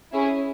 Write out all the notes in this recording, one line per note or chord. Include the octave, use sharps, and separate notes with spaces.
C#4 E4 G#4